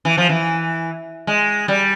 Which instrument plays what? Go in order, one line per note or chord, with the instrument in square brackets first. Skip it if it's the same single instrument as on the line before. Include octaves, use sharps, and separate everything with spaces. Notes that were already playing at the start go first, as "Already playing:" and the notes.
[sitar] E3
F3
E3
G#3
G3